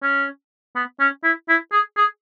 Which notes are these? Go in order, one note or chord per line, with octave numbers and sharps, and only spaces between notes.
C#4
B3
C#4
E4
E4
G#4
G#4